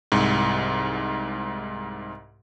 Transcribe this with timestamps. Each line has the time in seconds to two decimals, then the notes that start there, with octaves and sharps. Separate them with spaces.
0.12 C2 G#2